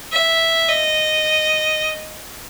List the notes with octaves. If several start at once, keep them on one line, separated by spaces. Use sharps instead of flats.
E5
D#5